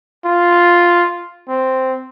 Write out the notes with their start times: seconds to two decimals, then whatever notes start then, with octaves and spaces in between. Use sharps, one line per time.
0.25 F4
1.48 C4